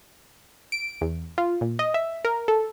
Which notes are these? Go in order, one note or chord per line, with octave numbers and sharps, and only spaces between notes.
D7
E2
F4
A#2
D#5
E5
A#4
A4